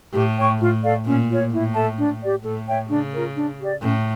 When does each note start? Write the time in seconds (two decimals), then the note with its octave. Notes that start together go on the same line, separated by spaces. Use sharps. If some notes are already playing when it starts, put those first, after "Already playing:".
0.13 A2 G4
0.37 C#5 G5 C#6
0.59 A2 F4
0.82 A4 D5 F5
1.05 A#2 C#4
1.28 F4 C#5
1.51 A2 E4
1.74 A4 E5 A5
1.97 D4
2.21 G4 D5
2.43 A2 A4
2.67 C#5 E5 G5
2.89 C#3 D4
3.12 F4 A#4
3.36 D4
3.59 G4 D5
3.81 A2 C#4